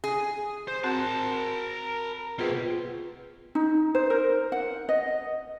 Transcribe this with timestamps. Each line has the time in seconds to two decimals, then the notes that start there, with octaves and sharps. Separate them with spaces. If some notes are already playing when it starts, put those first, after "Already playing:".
0.04 G#4
0.68 C5
0.84 C4 F#4 A#4 F#5 A5
2.39 B2 C4 F4 G#4 B4
3.55 D#4
3.95 C5
4.10 A#4
4.52 F#5
4.89 D#5